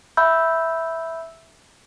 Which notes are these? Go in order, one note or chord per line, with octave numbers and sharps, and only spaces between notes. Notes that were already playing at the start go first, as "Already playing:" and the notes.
E5 B5 E6 G6